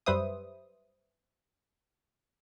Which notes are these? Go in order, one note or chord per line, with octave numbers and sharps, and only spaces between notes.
F#2 G3 B4 C5 E5 D#6